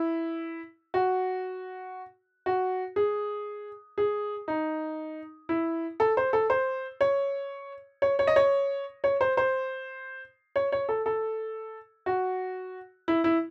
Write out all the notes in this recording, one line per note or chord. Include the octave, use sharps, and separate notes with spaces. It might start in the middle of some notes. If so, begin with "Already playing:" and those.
Already playing: E4
F#4
F#4
G#4
G#4
D#4
E4
A4
C5
A4
C5
C#5
C#5
C#5
D#5
C#5
C#5
C5
C5
C#5
C#5
A4
A4
F#4
E4
E4